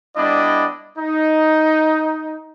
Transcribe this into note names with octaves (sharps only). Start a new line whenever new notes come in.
G3 B3 D4 E4 D5 D#5
D#4